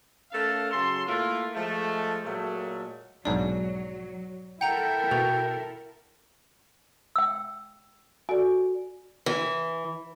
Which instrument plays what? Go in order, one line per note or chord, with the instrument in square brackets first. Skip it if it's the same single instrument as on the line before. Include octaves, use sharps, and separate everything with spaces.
[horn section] A3 C#4 A4 A#4 F5
C#3 F#3 A4 C6
A3 A#3 E4 F4
F3 G#3 A3
A#2 F#3 G#3 A3
[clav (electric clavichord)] B1 G#2 D4 [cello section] F#3 [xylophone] D5
[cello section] E4 A4 A#4 [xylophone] F#5 A#5 G6 [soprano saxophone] G5
[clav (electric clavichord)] B2 B3 [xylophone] F7
[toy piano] G5 E6
[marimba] F#4 A4 D5 [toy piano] G#5
[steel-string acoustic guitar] E3